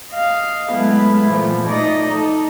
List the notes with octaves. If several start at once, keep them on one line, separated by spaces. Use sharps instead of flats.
D#5 F5
F#3 G#3 A3 B3 E4
A#2 E3 F3 A3
A3 D#4 D5 D#5 A#6
D#4 A4